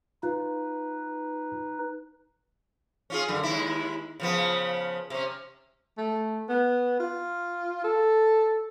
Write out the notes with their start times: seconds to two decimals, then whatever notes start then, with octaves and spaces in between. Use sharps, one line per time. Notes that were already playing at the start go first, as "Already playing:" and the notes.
0.23 D#4 F4 B4
3.10 C#4 F4 G#4
3.28 F#2 D3
3.43 D#2 G#3 E4
4.20 C#3 F3 B3
5.10 C3 C#4
5.98 A3
6.49 B3
7.00 F4
7.84 A4